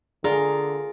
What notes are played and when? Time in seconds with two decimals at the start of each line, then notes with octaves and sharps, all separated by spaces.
0.24 D3 F4 G#4 A#4 D5